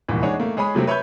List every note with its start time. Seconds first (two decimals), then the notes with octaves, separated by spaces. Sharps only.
0.08 D#1 G#1 C3 E3
0.22 G#3 D4 D#4 G#4 C#5 F#5
0.40 A3 A#3
0.57 G#3 G#4 C#5 B5 D#6
0.75 C3 F#3 A3 C4
0.87 B4 C#5 E5 B5 C#6 G6